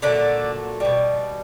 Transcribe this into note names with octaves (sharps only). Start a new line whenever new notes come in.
A#2 D3 F#3 A3 D4
B2 G3